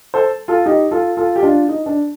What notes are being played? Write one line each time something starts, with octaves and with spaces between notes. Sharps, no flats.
A4 C5
F4 A4
D#4 G4
F4 A4
F4 A4
G4
D4 F4
D#4
D4